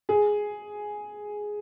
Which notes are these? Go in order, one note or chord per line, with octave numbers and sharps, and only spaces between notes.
G#4